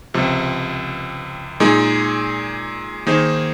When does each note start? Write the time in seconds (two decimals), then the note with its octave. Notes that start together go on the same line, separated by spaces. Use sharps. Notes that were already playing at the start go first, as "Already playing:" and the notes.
0.14 C#2 C3 F3
1.60 A#2 G#3 D#4 G#4
3.06 D#3 A#3 D#4 G#4 C5